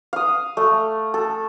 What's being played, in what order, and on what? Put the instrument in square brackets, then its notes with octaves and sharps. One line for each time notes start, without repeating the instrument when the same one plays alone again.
[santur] F5 D#6
A3
A4